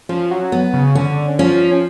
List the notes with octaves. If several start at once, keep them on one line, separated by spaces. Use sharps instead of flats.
F3 C#4
F#3
B3
C#3
D3 C#4
F3 C#4